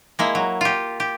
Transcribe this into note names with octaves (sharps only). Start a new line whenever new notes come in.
G#3 A#3 E4
F#3
F4 G4
G4